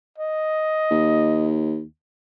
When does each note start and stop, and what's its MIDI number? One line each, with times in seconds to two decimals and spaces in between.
0.18 1.51 75
0.91 1.83 39